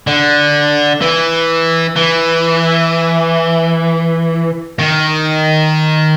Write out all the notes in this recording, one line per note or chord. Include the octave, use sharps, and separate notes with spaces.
D3
E3
E3
D#3